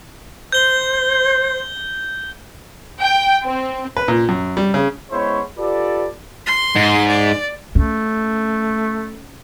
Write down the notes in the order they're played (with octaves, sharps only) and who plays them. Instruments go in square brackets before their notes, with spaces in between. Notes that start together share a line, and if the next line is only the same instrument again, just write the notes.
[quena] C5 [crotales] G6 G7
[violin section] G5
C4
[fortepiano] B4
A#2
F#2
G3
C#3
[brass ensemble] G#3 B3 C#4 E4 C5 C#5
F4 G4 A4 B4 D5
[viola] C6
[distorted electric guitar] G#2
[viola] D5
[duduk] A3 [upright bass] C#4